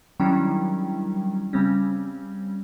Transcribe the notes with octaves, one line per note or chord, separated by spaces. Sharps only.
D#3 F#3 G3 C#4 D4 E4
C#3 G3 C4 C#4